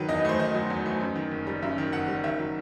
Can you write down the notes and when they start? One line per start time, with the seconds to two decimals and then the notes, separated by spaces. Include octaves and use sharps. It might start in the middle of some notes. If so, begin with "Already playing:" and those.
Already playing: D#3 F#3 B4
0.09 E2 D#5
0.25 A3 C5
0.39 D#3 D#5
0.55 F#3
0.70 E2
0.86 A3
1.01 F#2
1.16 D#3
1.31 F#1
1.47 G3
1.62 F#2 E5
1.78 D#3
1.92 F#1 F#5
2.08 G3
2.24 D#3 E5
2.39 F#3